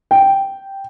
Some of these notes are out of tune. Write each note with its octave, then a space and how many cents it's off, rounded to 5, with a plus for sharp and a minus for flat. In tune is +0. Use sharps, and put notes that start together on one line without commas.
G5 -5